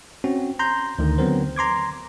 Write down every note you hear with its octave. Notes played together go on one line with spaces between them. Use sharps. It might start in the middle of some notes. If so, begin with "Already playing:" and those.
C4 C#4 F#4
A#5 C6 G6
D2 D3 D#3
D3 F#3 B3 C4 A#4 C5
A#5 C6 D6 G#6